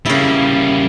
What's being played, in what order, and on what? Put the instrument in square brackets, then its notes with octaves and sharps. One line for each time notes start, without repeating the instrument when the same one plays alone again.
[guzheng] C#3 E4 [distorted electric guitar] G3 A#3